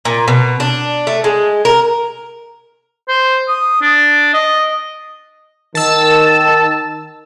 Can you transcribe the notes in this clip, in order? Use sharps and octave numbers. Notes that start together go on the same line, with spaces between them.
A#2
B2
D4
A3
G#3
A#4
C5
D#6
D4
D#5
D#3 A5 E6